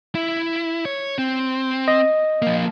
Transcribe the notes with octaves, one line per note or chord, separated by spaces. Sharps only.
E4
C#5
C4
D#5
F3 A#3